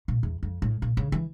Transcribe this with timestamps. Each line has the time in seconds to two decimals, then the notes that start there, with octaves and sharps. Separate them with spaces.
0.08 A#2
0.23 E2
0.43 F2
0.62 A2
0.82 A#2
0.97 C#3
1.12 E3